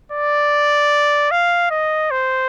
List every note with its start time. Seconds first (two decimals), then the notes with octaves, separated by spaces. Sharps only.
0.12 D5
1.31 F5
1.71 D#5
2.11 C5